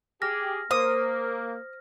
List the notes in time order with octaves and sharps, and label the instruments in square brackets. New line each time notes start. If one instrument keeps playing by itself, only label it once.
[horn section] G4 G#4 [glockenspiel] F6 A#6
[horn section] A#3 [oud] C5 [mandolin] D#6